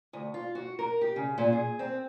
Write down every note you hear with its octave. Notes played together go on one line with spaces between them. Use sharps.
D2
F4
F#4
A#4
G4
C#3
A#2
G#4
C4